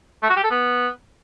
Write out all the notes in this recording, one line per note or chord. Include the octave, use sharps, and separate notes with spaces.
A3
F#4
G4
A4
B3